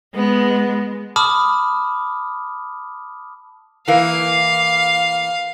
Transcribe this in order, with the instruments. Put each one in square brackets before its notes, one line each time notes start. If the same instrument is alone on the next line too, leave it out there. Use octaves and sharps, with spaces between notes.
[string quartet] G#3 B3
[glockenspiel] A5 B5 D6 D#6 F6
[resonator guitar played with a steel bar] E3 A#3 [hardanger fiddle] F5